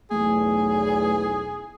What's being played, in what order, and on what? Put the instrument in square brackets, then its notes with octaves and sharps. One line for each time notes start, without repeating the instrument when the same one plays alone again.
[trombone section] B1 E2 [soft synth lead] A3 [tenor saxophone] G#4